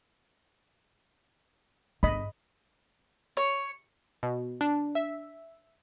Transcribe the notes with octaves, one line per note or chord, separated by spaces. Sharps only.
G1 D#5 B5
C#5
B2
D4
E5